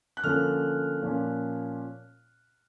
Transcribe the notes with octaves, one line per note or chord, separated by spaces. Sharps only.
F#6
D3 F3 A#3 C#4 F6
A#2 F3 A#3 C#4